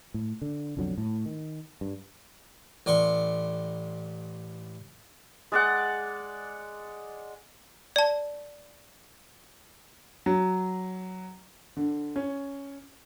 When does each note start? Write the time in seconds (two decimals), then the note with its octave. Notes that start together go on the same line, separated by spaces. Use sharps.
0.14 A2
0.42 D3
0.77 B1 F2 D3 F#3
0.98 A2
1.26 D#3
1.81 G2
2.86 A1 D5 C6 C#6
5.52 G#3 D5 F#5
7.96 D5 A5
10.26 F#3
11.77 D3
12.16 C#4